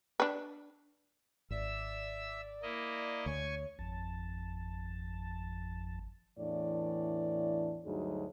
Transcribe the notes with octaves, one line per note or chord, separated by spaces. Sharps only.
D4 B4
G#1 D5 E5 E6
A#3 E4 D#5
D2 C#5 G#5 C#6 G#6
G#1 F2 A5
E2 A2 E3 D4 D5
D2 G2 F#3 D#4 G#4